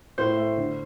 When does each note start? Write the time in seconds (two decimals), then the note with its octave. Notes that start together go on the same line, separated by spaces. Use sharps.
0.18 A2 C5
0.37 A3
0.57 D3